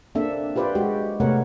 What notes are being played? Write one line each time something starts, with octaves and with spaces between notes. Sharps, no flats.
A#3 C4 D4 A4 E5
F4 G4 B4 C5 D5
G#3 F#4 G4
C3 A3 B3 A#4 C#5 F#5